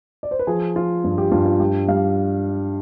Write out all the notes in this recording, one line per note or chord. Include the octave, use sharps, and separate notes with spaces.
D5
C5
B4
F3 G#4
F3 F4
G2
G4
G2 F4
F4
G3 G4
G3 F5